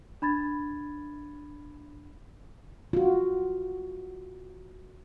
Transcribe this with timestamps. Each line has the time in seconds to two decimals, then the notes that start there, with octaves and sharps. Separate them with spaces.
0.22 D4 B5 G#6 A6
2.93 F4 F#4